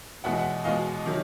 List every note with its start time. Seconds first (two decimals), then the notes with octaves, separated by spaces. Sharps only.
0.24 E2 B2 G#3 E5 F#5
0.37 E5 F#5
0.64 E2 B2 G#3 D#5 F5
1.06 C3 D#3 F#3